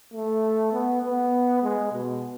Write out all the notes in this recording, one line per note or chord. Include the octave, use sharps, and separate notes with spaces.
A3
B3
B3
G#3
B2